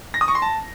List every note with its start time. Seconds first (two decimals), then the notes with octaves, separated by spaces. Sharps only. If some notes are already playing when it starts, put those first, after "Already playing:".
0.14 A#6
0.21 D#6
0.28 C#6
0.35 C6
0.42 A5